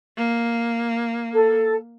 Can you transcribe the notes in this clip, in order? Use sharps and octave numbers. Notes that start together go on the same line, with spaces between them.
A#3
A4